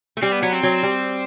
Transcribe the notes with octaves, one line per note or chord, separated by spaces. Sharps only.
A3
G3 C4
B3
F#3 B3
C4
F#3
G3